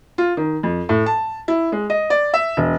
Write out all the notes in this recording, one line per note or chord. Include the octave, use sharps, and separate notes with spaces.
F4
D#3
F2
A2
A5
E4
G#3
D#5
D5
E5
E1